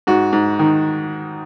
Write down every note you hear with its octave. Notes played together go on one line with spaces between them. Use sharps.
G#2 F#4
G#2
D#3